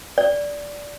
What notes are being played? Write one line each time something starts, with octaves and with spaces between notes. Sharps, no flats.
D5